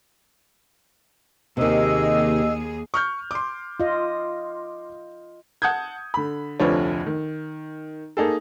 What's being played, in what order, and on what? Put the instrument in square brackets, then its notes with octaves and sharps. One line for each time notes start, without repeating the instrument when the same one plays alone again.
[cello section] D#2 G#4 [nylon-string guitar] C3 D#3 [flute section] G4 D#5 E6
[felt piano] C#6 F6 G6
C6 D6
[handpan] F4 D#5
[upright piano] F#5 A5 D#6 G6 G#6
D3 B5
F1 D2 F3 D4 B4 C#5
D#3
A#3 D#4 G#4 A4